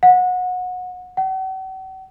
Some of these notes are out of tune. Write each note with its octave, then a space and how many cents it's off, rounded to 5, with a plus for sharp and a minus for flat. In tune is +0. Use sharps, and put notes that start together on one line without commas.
F#5 -25
F#5 +45